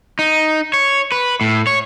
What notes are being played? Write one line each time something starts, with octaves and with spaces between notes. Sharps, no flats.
D#4
C#5
B4
A2
C#5